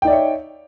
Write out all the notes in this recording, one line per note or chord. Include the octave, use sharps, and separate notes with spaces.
D#4 C#5 D5 E5 G5